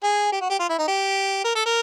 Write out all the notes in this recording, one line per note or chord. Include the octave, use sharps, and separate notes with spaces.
G#4
G4
F#4
G4
F4
E4
D#4
G4
A#4
A4
A#4